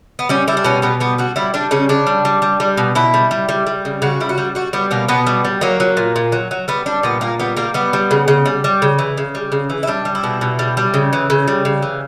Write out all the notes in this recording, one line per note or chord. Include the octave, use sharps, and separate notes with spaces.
B3
G3 C#4
G3 E4
D4
B2 C#4
B2 B3
G3 B3
G3 F#4
G3 E4
G3 D4
C#3 C#4
C#3 D4
G3
G3
G3
G3
B2
B2 E4
G3
G3
G3
G3
C#3
C#3 F#4
G3 E4
F#4
G3
G3 F#4
G3 B3
B2 A#3
B2 B3
G3
G3
F#3 A#3
F#3
A#2
A#2
F#3
F#3
G3 B3
G3 D4
A#2 B3
A#2 A#3
G3 B3
G3 A#3
G3 B3
G3
C#3
C#3
G3
G3
C#3
E3
C#3
G3
C#3
E3
E4
G3 D4
G3
E4
B2
B2
G3
G3
C#3
E3
C#3
G3
C#3
E3